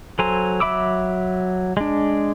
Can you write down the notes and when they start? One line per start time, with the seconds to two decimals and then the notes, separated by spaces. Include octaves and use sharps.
0.19 F#3 A4 C5 G#5 A#5
0.60 F#3 E5 B5 D6 E6
1.77 G#3 D4